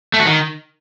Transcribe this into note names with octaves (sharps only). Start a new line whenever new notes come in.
A3
F#4
D#3